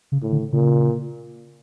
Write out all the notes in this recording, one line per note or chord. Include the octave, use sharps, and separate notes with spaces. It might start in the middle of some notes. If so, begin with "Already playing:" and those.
C#3
A2
D3
A#2 C#3